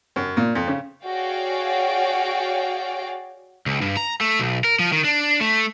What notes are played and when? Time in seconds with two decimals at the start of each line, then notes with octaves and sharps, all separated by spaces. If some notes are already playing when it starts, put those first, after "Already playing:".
0.16 F#2
0.37 A#2
0.55 F2
0.67 C#3
1.05 F#4 G#4 C#5 D5 F5 G5
3.66 C#2
3.81 G2
3.97 A#5
4.21 A3
4.39 B1
4.64 A#4
4.79 F3
4.92 D#3
5.04 D4
5.41 A3